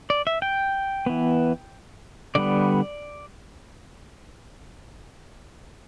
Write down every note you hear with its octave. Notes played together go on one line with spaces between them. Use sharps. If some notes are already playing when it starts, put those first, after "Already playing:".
D5
E5
G5
E3 B3
D3 G3 B3 D5